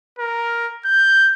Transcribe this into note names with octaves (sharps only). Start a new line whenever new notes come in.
A#4
G6